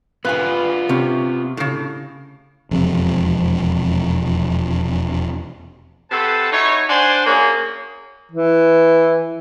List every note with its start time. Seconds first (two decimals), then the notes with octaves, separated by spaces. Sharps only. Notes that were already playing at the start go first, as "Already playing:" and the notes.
0.25 B3 F4 B4 G#5
0.89 C3 C#4
1.57 A2 C#3
2.71 E1 F2 C3
6.11 C3 A4 B4 C5 F#5 A5
6.52 D#4 E4 F#4 C#5
6.90 D4 C5 F#5 G#5 C6
7.26 A#3 C#4 F#4 G#4
8.32 E3